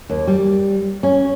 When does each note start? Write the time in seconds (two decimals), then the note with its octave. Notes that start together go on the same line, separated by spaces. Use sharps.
0.09 D#2
0.27 G3
1.03 C#4